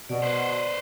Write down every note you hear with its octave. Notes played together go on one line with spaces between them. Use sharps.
B2 D5
B4 C5